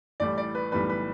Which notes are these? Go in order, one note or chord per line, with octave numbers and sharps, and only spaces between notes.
A1 A2 G3 D5
D5
B4
B1 A2 E3 G3 B4
B4